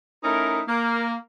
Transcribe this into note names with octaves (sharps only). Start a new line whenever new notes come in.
A3 C#4 D#4 E4 A#4
A#3